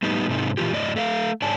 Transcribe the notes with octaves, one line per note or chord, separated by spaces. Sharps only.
A2 G3 B3 D#4
G#2 C3 C4 D#4
A#2 E3 G#3 F4 G4
F#2 A2 D5 D#5
A3 E5 F5
G#2 C#5 D5 G#5 A5